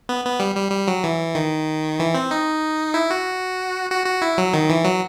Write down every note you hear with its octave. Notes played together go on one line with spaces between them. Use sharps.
B3
B3
G3
G3
G3
F#3
E3
D#3
E3
C4
D#4
E4
F#4
F#4
F#4
E4
F#3
D#3
E3
F#3